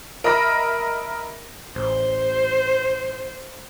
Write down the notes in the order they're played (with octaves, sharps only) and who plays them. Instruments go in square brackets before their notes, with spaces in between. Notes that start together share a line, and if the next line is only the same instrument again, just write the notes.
[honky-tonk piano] A#4 D#5 E5 B5 A#6
[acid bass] A1 [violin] C5